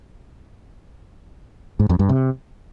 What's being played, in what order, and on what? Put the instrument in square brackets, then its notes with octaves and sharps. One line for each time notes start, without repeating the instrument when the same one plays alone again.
[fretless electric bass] G#2
F2
G2
C3